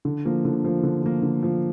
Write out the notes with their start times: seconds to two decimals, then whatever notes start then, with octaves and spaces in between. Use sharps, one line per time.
0.05 D3
0.25 F3 A#3
0.45 D3
0.64 F3 A#3
0.83 D3
1.02 F3 A#3
1.22 D3
1.43 F3 A#3